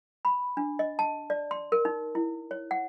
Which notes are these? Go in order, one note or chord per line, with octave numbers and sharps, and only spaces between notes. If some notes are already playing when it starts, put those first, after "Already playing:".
B5
D4
D#5
A5
D5
C6
A#4
D#4
E4
C#5
F#5